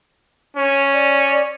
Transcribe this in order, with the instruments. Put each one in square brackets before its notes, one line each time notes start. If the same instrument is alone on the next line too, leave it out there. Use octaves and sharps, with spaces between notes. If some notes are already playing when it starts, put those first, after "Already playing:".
[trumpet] C#4 [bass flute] C#5
[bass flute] D5